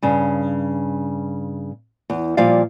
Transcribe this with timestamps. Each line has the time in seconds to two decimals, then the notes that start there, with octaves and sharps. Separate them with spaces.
0.02 G2 C#3
2.10 E2
2.37 A#2 F3 G3 D5 F5